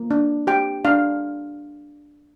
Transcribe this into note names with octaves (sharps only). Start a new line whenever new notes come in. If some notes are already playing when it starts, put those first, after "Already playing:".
Already playing: A#3
D4
G4 G5
D4 F5